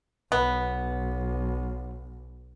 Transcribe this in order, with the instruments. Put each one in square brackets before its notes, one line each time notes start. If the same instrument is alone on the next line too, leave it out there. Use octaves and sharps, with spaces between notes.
[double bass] B1 [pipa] B3